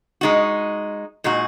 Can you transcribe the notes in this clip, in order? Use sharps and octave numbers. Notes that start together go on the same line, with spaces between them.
G#3 D#4 F#4
A#2 G#3 D#4 F#4